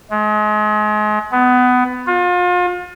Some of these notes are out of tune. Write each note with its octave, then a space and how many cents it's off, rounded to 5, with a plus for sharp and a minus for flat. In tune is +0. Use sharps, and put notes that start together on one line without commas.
G#3 +35
B3 +20
F4 +35